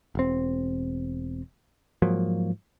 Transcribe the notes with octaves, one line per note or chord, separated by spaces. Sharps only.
E1 C4
G#2 F3 F#3 A#3